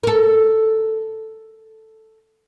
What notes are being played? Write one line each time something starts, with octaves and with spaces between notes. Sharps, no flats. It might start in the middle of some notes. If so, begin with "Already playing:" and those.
A4 A#4